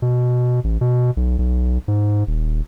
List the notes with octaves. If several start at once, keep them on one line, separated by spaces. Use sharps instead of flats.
B2
A1
B2
B1
B1
G#2
D#1